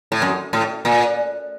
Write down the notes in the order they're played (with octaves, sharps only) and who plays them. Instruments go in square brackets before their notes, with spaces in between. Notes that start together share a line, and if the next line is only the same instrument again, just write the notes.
[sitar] A2
F#2
A2
A#2